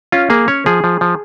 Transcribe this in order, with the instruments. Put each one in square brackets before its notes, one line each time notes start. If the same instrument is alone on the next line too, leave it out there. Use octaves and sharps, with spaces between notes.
[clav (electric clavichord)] C#4 F4
A#3 G#4
C#4 C#5
F3 G#4
F3
F3